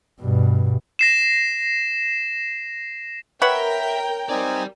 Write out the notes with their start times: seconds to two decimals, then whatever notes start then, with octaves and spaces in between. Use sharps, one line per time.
0.21 G2 B2
0.99 A#6 C7 E7
3.42 A#4 B4 C#5 E5 F#5 G5
4.29 C4 D#4 G4 D5 G#5